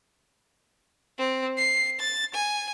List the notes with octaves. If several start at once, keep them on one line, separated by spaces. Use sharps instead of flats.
C4
C7
A6
G#5